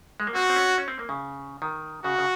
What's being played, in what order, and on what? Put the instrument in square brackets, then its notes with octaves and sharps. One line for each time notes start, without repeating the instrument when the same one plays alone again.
[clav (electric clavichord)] G#3
A#3
[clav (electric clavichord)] C4 [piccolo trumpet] F#4
[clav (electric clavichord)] C4
C#4
C#4
C4
A#3
C#3
D#3
[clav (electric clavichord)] C#3 [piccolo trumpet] F#4
[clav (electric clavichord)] C#3